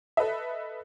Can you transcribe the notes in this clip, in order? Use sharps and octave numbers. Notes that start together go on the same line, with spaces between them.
A4 B4 D#5 E5